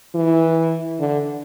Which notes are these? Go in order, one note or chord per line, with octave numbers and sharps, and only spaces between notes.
E3
D3